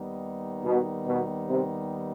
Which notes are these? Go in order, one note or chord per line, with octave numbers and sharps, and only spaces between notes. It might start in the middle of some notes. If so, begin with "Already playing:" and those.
Already playing: D#2 D#3 G3 B3 D#4
B2
B2
C3